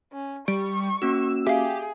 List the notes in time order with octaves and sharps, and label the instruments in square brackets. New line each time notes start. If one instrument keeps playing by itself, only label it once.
[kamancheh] C#4
[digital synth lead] G3 [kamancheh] C#6 [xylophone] D7
[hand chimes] A#3 C#4 F#4 [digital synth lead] E6
[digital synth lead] G4 [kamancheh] G#4 [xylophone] E5 F5